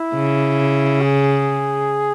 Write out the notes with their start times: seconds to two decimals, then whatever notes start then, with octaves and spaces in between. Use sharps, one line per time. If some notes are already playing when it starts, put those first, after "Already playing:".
Already playing: E4
0.14 C#3
1.02 G#4